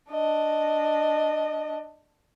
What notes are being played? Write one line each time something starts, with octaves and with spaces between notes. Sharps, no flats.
D4 D#5